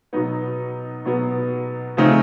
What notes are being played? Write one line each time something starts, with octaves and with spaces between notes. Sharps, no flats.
B2 F#3 B3 D#4
B2 F#3 B3
C#3 F3 A3 C4 D#4